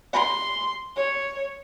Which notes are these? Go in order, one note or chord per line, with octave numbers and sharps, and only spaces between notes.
C6
C#5